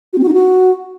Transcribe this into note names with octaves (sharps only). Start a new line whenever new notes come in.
F#4
C4
F#4
D#4
F#4